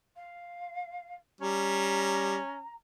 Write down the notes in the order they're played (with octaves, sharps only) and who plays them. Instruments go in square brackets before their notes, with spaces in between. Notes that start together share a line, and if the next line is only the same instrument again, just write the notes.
[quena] F5
[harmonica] G3 [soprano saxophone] C#4 [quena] A#5